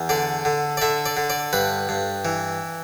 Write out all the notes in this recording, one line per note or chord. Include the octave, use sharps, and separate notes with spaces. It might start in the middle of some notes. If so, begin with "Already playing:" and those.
Already playing: E2
D3 D5
D3
D5
D3 E5
D5
D3
D5
G2 B4
G2
E3